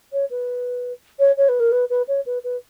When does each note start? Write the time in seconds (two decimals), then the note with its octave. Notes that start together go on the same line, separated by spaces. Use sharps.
0.12 C#5
0.30 B4
1.19 C#5
1.37 C#5
1.48 B4
1.59 A#4
1.71 B4
1.90 B4
2.08 C#5
2.26 B4
2.44 B4